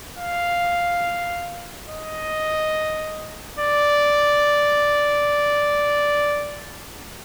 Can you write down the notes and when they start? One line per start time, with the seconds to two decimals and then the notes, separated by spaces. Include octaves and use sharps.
0.19 F5
1.89 D#5
3.59 D5